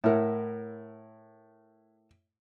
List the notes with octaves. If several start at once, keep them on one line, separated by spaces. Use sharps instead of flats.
A2 E4 A#4 F#5